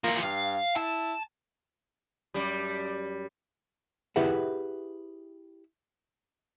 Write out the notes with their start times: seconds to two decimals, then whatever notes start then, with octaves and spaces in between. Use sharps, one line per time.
0.04 E3 F3 A#3
0.23 G2 F5
0.76 E4 A5
2.34 F#2 G3
4.16 E4 G4 G#4 B4 E5 F#5